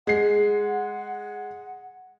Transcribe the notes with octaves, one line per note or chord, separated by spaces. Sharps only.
G#3 F#5 C7